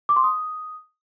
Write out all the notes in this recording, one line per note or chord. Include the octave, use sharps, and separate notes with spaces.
D6
C6
D#6